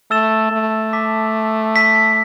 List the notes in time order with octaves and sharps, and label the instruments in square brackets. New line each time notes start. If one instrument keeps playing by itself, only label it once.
[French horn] A3 [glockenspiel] E6 A6 E7 G7
[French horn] A3
[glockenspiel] A5 D6 B6
A5 E6 B6